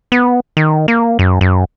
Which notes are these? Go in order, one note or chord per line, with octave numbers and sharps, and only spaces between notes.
B3
D#3
A#3
F#2
F#2